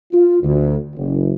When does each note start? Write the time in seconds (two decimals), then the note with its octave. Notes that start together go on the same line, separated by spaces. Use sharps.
0.13 F4
0.42 D2
0.96 F#1